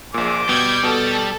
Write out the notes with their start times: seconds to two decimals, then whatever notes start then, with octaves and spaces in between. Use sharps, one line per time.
0.14 A#1 A#2 G#4 D6
0.49 B2 G3 G6 G#6
0.83 B2 A4